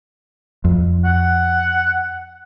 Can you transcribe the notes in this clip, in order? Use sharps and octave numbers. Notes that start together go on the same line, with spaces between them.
F2
F#5